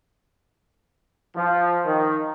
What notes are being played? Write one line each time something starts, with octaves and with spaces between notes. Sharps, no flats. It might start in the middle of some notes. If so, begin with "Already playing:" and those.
F3
D#3